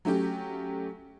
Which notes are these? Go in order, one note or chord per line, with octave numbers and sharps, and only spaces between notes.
F#3 A3 C#4 G4